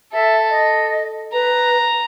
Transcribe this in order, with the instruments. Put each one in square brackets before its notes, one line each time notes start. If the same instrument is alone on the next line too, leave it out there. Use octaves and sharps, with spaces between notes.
[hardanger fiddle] A4 [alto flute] E5
[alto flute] D#5
[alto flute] B4 [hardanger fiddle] A#5